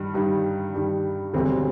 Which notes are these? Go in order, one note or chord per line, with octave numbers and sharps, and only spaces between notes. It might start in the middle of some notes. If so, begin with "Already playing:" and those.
Already playing: G2 D#3 G3
G2 D#3 G3
G2 D#3 G3
E1 D2 D3 G3 C4